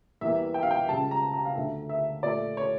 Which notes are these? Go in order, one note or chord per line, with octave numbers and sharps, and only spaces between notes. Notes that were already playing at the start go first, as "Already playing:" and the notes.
E2 E3 G3 A#3 E5
G5
F5
G5
C#2 C#3 G3 A5
A#5
A#5
F5
D2 D3 A3 E5
E5
A#2 A3 D5
C#5